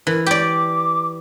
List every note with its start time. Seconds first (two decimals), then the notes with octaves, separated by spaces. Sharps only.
0.07 E3 A#4
0.26 G4 D5 D6